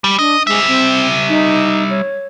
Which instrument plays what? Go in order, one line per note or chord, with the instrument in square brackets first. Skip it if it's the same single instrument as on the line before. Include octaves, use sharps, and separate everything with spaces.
[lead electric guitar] G3
[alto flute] D4 [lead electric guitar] D#5
[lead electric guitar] G3 E5 [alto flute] G#3
[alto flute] C4
D#4
C#5